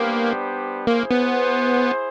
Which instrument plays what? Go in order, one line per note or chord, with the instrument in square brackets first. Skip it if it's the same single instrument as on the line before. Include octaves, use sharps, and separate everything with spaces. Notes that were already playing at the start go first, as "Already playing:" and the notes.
Already playing: [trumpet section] G3 B3 D4 G4 C5 [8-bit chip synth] A#3
[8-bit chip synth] A#3 [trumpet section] E4 G#4 C5
[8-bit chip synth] B3